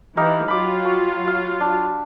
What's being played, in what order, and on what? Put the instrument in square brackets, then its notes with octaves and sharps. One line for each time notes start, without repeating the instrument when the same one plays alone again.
[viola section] E3 [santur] D#4 G4 F5
[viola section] F#3 F4 [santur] B5 D6
[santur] C#6
F5
D4